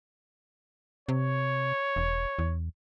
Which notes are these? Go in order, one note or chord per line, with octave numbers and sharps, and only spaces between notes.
C3 C#5
E1
E2